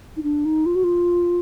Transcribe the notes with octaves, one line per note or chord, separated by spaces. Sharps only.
D#4
D4
D#4
F4
F#4
F4